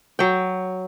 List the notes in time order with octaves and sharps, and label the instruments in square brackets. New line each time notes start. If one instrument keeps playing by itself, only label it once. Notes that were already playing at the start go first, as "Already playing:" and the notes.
[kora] F#3 G5